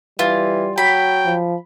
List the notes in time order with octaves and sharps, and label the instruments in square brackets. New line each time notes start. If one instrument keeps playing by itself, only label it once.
[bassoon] E3 [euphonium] G3 [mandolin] F4
[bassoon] F#3 [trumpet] G5 [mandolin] B5
[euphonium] F3